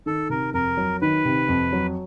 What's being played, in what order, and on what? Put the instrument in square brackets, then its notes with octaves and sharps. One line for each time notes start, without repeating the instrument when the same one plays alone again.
[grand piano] D#3 [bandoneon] A4
[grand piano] C3 [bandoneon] A#4
[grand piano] F2 [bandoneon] A#4
[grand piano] F#3
[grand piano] D#3 [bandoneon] B4
[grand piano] C3
F2
F#3